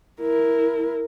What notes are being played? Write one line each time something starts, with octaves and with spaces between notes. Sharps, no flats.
E4 A#4